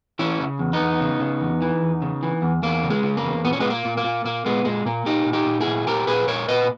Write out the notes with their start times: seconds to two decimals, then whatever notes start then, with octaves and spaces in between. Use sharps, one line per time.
0.19 E3 C#4 E4
0.40 C#3
0.59 E2
0.73 B3 D#4
0.80 E2
1.01 C#3
1.20 C#3
1.41 E2
1.62 E3
1.82 E2
2.02 C#3
2.23 E3
2.42 E2
2.63 E2 A#3
2.83 C#3
2.90 G#3
3.03 C#3
3.17 A#3
3.23 E2
3.44 A#2 B3
3.53 C#4
3.60 A#2 G#3 B3
3.70 A#3
3.85 A#2
3.97 A#3
4.04 A#2
4.24 A#2 A#3
4.45 A#2 G#3 B3
4.65 A#2 G#3
4.85 A#2 A#3
5.06 A#2 D#4 G4
5.26 A#2
5.33 D#4 G4
5.46 A#2
5.61 E4 G#4
5.67 A#2
5.87 A#2 G4 A#4
6.07 A#2 G#4 B4
6.28 A#2 A#4 C#5
6.48 A#2 B4 D#5